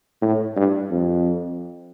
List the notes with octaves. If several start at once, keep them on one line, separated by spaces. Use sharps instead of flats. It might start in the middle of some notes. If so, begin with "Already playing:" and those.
A2
G2
F2